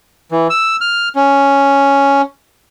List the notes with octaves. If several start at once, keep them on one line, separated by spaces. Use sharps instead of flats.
E3
E6
F6
C#4